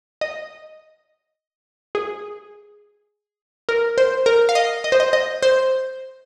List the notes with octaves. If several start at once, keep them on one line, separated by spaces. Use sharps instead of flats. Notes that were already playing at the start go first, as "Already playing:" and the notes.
D#5
G#4
A#4
C5
A#4
F5
D#5
D#5
C5
D#5
D#5
C5